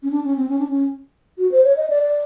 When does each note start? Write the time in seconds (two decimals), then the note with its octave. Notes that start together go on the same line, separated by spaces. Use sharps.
0.03 C#4
0.11 D4
0.24 C#4
0.36 C4
0.49 C#4
0.59 D4
0.68 C#4
1.38 F#4
1.52 C5
1.64 C#5
1.77 D#5
1.90 D5
2.02 D5